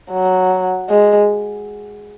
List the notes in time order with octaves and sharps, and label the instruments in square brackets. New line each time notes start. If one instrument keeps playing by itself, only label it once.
[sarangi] F#3
G#3